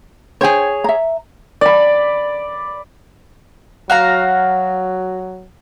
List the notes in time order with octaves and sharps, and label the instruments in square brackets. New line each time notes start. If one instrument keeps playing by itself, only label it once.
[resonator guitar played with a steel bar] G#4 C#5 [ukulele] C5 G5
[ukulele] E5 A#5
[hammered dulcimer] D5 B5
[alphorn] F#3 [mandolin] F#4 F5 A#5